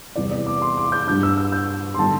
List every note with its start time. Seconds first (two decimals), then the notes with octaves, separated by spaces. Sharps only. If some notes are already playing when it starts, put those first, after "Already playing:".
0.16 E2 C3 G3 D5
0.31 D5
0.47 D6
0.62 C6
0.77 D6
0.92 G6
1.07 G2 G3 D4 G6
1.23 E6
1.37 E6
1.52 G6
1.94 C6
1.99 D3 G3 D4 A5